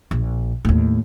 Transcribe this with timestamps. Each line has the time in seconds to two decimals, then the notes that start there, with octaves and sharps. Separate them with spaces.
0.11 A#1
0.65 D#2 A2